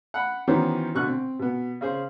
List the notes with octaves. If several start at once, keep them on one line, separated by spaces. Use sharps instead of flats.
F#5 B5
D#3 E3 F#3 B3 C#4 C5
B2 D3 C#6 F#6
C4
B2 B3
C#3 G#4 C5